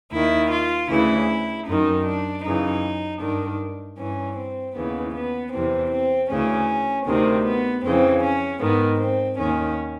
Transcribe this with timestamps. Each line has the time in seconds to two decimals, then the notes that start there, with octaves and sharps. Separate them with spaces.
0.12 D#2 D#3 E4
0.51 F4
0.90 D2 C#3 E3 E4
1.67 F#2 D#3 D#4
2.06 D4
2.44 F#2 C#3 E3 D#4
3.21 G2 D#3 D4
3.98 G2 E3 C#4
4.37 C4
4.76 D#2 C#3 E3 B3
5.14 B3
5.52 E2 C3 E3 C4
5.91 C4
6.30 D2 C#3 E3 C#4
7.07 D2 C3 D#3 C4
7.45 B3
7.84 F2 C#3 E3 C4
8.23 C#4
8.61 G#2 D#3 B3
9.00 C4
9.38 D#2 D#3 C#4